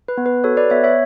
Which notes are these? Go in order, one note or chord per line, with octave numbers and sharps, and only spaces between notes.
B4
B3
B4
F#4 A4 C#5
B4 D5
B3 C#5 E5
C#5 E5